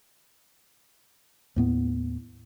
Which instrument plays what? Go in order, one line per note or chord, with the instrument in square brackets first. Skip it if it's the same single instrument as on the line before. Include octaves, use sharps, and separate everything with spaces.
[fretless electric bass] D#2 A2 B3